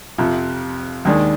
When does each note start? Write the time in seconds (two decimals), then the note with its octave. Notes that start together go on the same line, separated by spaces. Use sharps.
0.18 F2 C3 F3
1.05 D#2 D#3 G#3 D4